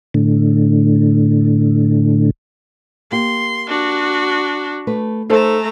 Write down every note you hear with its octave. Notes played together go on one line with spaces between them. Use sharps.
A2 D3
A#3 G4 C6
D4 F#4
A3 B4
A3 D#4 A4 C5 A#5